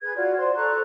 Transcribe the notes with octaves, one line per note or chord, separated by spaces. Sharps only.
G#4 B4 G#6
F4 F#4 D5
C5 D5 C6
A4 A#5 C#6 F#6